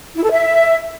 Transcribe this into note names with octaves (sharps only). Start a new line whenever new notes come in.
E4
A4
E5